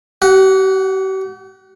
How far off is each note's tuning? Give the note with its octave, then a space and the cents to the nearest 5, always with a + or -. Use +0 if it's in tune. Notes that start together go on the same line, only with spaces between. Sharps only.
G4 -45 F#5 +0